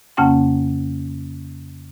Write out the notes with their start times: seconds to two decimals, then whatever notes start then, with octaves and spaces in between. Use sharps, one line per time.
0.17 F2 C#3 A#3 C#4 F#5 G5